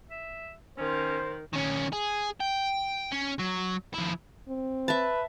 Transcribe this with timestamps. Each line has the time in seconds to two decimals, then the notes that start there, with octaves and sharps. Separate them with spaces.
0.10 E5
0.78 D#3 C#4 C5
1.53 D#3 C#4
1.93 G#4
2.40 G5
3.12 C#4
3.39 F#3
3.94 F3 E4
4.48 C4
4.88 B4 E5 A5